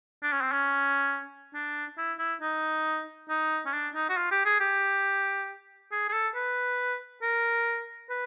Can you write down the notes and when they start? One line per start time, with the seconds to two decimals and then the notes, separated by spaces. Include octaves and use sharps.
0.23 D4
0.32 C#4
0.41 C4
0.52 C#4
1.55 D4
1.98 E4
2.19 E4
2.41 D#4
3.29 D#4
3.66 C#4
3.73 D4
3.95 D#4
4.09 F#4
4.17 F4
4.31 G4
4.46 G#4
4.60 G4
5.92 G#4
6.09 G#4
6.13 A4
6.35 B4
7.22 A#4
8.10 B4